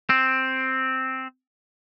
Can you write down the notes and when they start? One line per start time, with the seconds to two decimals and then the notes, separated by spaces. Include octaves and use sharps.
0.10 C4